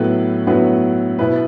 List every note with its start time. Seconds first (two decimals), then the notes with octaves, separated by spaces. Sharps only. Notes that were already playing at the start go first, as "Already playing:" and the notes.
Already playing: A2 F#3 B3 E4 B4
0.47 A2 F#3 B3 E4 B4
1.19 B2 B3 E4 B4